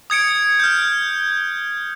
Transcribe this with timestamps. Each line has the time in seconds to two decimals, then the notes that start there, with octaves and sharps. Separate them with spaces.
0.10 D#6 G#6 C#7 D7
0.60 F6 G6